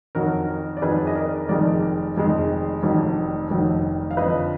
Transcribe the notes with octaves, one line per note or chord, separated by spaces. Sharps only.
F2 D#3 F#3 F#4 A#4
D5
F2 D#3 F#3 G#4 B4
D#5
A#4 D5
F1 F2 D#3 G#3 A#4 D5
F1 F2 D#3 G#3
F1 F2 D#3 F#3
F1 F2 D#3 F#3
F5
F2 D3 F3 B4 D#5